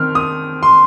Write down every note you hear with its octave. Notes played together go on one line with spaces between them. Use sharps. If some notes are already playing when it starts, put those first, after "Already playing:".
Already playing: D#3 C4 F6
D#6
C6